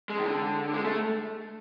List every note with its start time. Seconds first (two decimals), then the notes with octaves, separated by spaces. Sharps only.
0.10 G#3
0.19 D#3
0.26 D3
0.73 G#3
0.85 A3